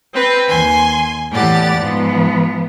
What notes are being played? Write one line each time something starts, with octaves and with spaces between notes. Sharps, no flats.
C4 B4 G5
D#2 G#5 C6
E2 A2 G4 D5 F#5 A6
G#2 F3 B3